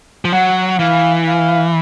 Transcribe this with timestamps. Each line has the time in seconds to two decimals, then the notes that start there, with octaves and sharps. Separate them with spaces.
0.25 F3
0.32 F#3 F#5
0.79 E3 F5
1.27 F5